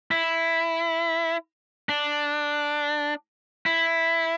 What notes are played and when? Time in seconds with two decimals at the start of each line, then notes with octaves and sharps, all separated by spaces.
0.11 E4
1.89 D4
3.66 E4